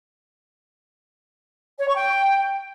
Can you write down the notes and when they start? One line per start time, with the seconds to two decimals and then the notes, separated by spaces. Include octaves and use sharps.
1.79 C#5
1.88 C#6
1.96 G5